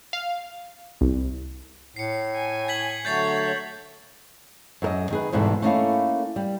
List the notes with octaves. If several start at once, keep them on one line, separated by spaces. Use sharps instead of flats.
F5
C2
A2 C7 C#7
G#5
G#6 B6 F#7
D3 F#3 A3 C#5 G6 A6 C7
F#2 A#4 D#5
D#3 G#4 B4
E2 G#2 B2 E3 G3 A4
A3 A#3 C#4 D#4 E4 F5
G3